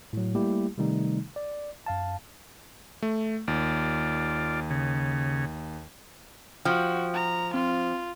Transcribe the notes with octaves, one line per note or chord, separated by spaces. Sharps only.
A2 F#3
G3 A3 A#3 E4 G4
C3 D#3 G3 A3 D#4
D5
F#2 F5 A5
A3
D#2 F4 D5
C#3
F3 F#4 G5
A#5
C4 F4